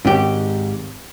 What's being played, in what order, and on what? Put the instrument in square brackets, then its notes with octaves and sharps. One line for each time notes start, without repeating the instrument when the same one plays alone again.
[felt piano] G#1 C#5 [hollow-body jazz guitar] G#2 G4